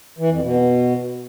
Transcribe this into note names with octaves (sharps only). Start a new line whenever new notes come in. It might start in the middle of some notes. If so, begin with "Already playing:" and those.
E3
F2
B2